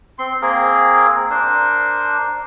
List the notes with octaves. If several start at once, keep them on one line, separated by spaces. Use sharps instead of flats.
C4 C6
A#3 C4 G#4 A#4
D4 A#4 C5